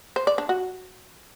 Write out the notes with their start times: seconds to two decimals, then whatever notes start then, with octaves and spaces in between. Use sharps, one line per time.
0.16 C5
0.27 D5
0.38 D4
0.49 F#4